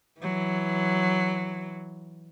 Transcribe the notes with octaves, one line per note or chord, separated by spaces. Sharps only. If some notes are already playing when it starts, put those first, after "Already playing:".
E3 F#3